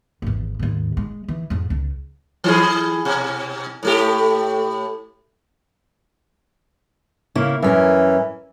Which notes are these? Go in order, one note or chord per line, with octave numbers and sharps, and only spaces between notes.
G#1 E2
D#2 G#2
G#3
E3
F2 G#2
C#2
E3 E4 G#4
B2
A2 A3 G4
C#3 A#3 E4
F#2 E3 C#4 A#4